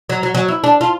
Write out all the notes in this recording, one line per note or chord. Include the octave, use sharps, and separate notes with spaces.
F#3
F#3
F#3
E4
D4
F4